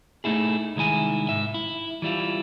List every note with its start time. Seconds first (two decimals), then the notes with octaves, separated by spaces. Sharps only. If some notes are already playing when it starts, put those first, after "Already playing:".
0.24 A3 A#3 D#4 E4 G#4
0.76 C2 D#3 G#3 E4 G#5
1.29 G#2 E5
1.54 E4
2.02 E3 G3 E4 F4